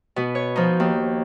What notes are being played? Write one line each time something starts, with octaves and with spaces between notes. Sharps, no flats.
B2 B3
C#5
F3 D#4
D#2